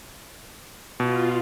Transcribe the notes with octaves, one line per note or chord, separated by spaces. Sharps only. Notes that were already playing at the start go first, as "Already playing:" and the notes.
B2 F4